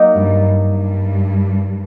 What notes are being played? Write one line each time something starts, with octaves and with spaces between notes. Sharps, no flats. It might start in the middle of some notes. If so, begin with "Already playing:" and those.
Already playing: F#3 A#3 D#4
G2
G2